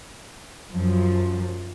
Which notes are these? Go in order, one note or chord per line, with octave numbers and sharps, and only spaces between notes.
F#2 F3